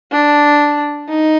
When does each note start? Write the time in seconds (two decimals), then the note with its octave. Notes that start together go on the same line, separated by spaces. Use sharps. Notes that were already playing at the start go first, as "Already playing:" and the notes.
0.12 D4
1.09 D#4